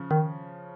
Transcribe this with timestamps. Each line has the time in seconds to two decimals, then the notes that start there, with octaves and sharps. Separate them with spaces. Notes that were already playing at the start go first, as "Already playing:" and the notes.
Already playing: C#3 F3
0.11 D#3